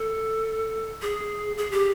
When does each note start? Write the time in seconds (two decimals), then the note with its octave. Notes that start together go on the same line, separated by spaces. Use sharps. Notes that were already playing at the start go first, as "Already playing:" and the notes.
Already playing: A4
1.02 G#4
1.57 G#4
1.72 G4